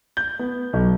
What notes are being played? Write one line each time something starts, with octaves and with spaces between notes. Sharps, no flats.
G6
B3
B1